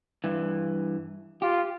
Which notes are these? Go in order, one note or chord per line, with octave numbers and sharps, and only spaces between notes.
G2 E3
F4 G4